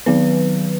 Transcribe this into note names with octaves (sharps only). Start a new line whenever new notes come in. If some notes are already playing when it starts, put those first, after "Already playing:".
D#3 F#3 B3 B4